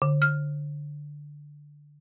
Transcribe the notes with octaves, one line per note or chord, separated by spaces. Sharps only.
D3
F6